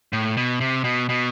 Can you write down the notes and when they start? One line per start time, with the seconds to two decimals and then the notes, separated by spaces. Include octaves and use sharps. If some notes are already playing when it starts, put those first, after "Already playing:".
0.13 A2
0.37 B2
0.60 C3
0.84 B2
1.09 B2